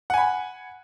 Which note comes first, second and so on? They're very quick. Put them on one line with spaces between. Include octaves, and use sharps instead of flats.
F#5 G#5 B5